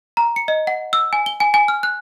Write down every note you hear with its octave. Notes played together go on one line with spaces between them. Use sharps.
A#5
C#7
D#5
F#5
E6
G#5
G7
G#5
G#5
F6
F#6